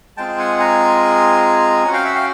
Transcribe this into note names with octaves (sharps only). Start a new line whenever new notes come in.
G#3 C4 F4 G#4 G5 A5
F#5 G#5
G#5 A#5
C#4 F#4 F#5
F5 G5
E5 F#5
F5 G5